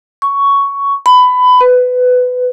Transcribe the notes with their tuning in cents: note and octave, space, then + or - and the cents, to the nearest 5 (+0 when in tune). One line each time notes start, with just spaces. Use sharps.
C#6 +10
B5 +20
B4 +20